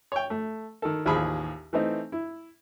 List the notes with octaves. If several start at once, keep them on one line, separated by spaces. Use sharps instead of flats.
C#5 G5
A3
D#3 A4
A1 D#2 F3 G#4 B5
E3 A3 C4 D#4
E4